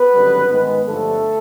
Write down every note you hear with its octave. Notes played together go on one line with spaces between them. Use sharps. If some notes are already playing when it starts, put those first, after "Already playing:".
Already playing: B3 B4
G#1 F#2 D3 G3
G#2 D#3 G#3 B3
G2 D3 F3 A3 A4